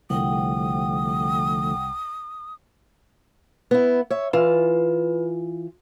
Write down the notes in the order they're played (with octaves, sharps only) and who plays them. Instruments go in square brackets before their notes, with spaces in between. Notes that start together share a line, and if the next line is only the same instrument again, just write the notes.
[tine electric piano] C2 [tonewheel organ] D3 F3 A3 [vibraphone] F#5 G5 [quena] D#6
[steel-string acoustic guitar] B3 E4
C#5 E5
[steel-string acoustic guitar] E3 F4 [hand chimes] B4